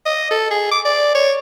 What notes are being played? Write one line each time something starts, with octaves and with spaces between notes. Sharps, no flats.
D#5
A4
G#4
D6
D5
C#5